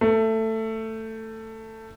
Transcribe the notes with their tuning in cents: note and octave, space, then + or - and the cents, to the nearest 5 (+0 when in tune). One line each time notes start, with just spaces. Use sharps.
A3 +15